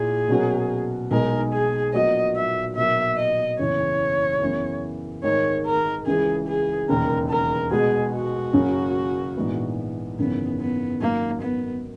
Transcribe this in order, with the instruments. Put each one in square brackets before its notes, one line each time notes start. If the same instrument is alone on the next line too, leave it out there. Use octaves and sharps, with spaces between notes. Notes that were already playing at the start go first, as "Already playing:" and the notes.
Already playing: [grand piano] A#2 A#3 E4 [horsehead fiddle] G#4
[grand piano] B2 F#3 C#4 F#4 A#4
[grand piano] B1 B2 G#3 D#4 G#4 [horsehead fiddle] A#4
[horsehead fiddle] G#4
[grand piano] A#1 A#2 F#3 B3 F#4 [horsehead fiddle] D#5
[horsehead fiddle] E5
[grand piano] B2 F#3 A#3 [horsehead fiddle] E5
[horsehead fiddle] D#5
[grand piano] F#1 E2 C#3 E3 [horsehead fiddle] C#5
[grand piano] F#2 C#3 E3 B3
[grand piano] G#1 G#2 D#3 G#3 [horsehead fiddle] C#5
[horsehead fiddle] A#4
[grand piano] C#2 C#3 E3 [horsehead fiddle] G#4
[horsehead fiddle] G#4
[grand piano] E1 D#2 C#3 [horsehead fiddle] A#4
[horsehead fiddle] A#4
[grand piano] B2 G#3 B3 F#4 [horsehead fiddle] G#4
[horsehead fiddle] F#4
[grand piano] F#1 F#2 C#3 F#3 C#4
A#1 G#2 E3 B3
[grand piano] G#1 F#2 C#3 E3 [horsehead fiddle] B3
[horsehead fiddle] B3
[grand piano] G#1 F#2 D#3 F#3 [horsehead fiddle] A#3
[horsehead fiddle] B3